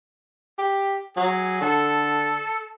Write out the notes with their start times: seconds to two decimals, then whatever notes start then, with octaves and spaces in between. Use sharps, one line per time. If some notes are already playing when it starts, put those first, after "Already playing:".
0.58 G4
1.17 F#3 G#4
1.61 D3 A4